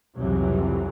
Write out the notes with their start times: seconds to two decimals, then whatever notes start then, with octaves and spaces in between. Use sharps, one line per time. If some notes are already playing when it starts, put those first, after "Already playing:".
0.16 C2 F2 G#2 C3 E3 F#3